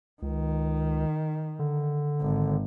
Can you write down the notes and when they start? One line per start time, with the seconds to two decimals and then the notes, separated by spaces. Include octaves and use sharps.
0.22 C#2 D#3
1.59 D3
2.21 G#1